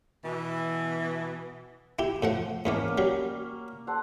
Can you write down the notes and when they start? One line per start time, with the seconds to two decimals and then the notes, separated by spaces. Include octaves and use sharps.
0.24 B2 E3
1.99 E4 G4
2.23 A2 F3 F#5
2.65 G#2 E3 A#3 B3 C#4
2.98 F#3 G3
3.87 A4 C5 F#5